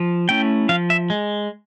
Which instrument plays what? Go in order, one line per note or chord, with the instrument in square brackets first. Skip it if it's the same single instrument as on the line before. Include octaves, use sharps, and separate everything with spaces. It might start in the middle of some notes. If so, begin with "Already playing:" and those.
Already playing: [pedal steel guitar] F3
A3 C#4 E4 G5
F3 F5
E5
G#3